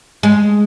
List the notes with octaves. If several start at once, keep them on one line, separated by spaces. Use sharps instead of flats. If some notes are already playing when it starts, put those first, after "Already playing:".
G#3